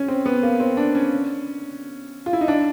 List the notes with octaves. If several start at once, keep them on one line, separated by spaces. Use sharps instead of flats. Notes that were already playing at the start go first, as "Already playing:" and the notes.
Already playing: C#4
C4
B3
A#3
C4
D4
C#4
F4
E4
D#4
D4